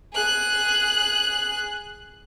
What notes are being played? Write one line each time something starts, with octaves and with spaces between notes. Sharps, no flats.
G#4 F#6